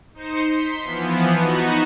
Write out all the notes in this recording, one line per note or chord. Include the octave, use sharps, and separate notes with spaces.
D#4 C5 C#7
C6 B6
E3 F3 B3
B3 D#4 F#4